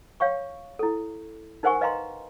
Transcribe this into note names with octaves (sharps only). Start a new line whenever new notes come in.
C#5 F5 G5 C#6
E4 A4
D#4 A#4 C5 F#5 G#5 C#6
B4 D#5 F5 G5 A#5 C6